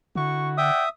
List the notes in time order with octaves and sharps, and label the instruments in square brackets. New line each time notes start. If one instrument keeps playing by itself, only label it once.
[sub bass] D3 [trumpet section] E4 F#4 C#6
[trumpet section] D5 F#5 G5 [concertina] E5 D#6